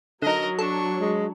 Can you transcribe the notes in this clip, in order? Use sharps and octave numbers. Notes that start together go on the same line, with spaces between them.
D3 F#3 D#4 A#4 D#5
D4 A4 C#6
G#3